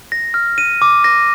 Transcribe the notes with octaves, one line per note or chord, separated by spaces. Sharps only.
A#6
F6
D#7
D6
A#6